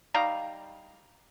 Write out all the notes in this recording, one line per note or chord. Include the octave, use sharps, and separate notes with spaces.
G3 D#4 F5 A#5